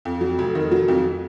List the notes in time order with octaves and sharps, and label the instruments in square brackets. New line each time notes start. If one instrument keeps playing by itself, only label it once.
[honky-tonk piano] F2
F#3
F1
D#3
F#3
F2